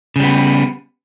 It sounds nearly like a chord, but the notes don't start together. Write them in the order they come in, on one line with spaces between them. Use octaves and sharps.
C#3 G3 B3